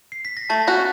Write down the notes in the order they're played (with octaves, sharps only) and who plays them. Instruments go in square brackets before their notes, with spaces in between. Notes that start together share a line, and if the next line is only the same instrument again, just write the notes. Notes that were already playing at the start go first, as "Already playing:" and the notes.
[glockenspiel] C7
B6
A#6
[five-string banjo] A3 [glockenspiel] A5 A6
[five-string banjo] C#4 F#4 [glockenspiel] G6